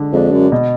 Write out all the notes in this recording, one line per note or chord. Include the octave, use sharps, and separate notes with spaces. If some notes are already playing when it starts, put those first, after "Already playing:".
Already playing: D3 G#3 D4
F2 G#3 D4
F#2
B2